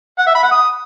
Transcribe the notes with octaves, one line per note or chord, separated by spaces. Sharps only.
F#5
E5
B5
F#5
D#6